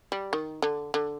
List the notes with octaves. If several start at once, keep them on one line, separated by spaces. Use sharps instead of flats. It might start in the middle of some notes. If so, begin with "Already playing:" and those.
G3
D#3
D3
D3